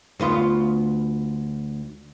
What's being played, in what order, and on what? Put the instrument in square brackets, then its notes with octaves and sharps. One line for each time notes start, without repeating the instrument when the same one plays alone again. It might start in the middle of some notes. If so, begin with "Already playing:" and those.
[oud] D2 B3 F4